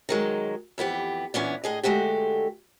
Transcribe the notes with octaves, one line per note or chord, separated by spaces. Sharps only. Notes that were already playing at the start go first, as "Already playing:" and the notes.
D#3 F#3 G#3
F2 E3 B3 G4
A#2 E3 B3 C#4 D4
A2 G#4 D#5
D3 G#3 A3 F#4 G4